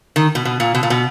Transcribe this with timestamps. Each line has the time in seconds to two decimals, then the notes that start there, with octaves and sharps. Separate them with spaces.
0.16 D#3
0.35 B2
0.45 B2
0.60 A#2
0.75 B2
0.83 A#2
0.90 B2